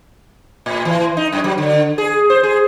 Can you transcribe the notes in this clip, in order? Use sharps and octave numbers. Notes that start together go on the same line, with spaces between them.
A2
E3
D#4
F#2
F#3
D3
G#4
C5
G#4